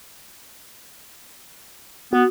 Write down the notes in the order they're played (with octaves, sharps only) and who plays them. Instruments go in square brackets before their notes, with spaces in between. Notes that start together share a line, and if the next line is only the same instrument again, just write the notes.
[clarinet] B3 [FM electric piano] F#4